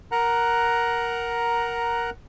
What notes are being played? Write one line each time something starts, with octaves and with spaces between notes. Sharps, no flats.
A#4 F#5 A#5 F#6